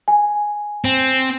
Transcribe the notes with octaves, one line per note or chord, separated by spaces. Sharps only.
G#5
C4